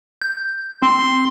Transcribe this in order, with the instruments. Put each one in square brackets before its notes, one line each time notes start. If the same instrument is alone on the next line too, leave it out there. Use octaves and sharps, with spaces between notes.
[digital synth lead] G6
[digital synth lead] C4 [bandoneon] C6